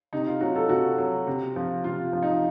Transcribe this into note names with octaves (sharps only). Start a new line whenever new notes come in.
C3 D#4
F4
F#3 F#4
A4
C3 F#4
F#3
C3
F3
C3 F4
F3
D#4